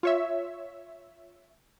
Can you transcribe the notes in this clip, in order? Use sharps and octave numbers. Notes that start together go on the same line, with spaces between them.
F4 C#5 E5